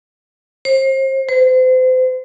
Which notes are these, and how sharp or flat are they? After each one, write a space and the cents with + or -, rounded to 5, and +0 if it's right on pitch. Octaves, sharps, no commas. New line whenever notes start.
C5 +35
C5 -35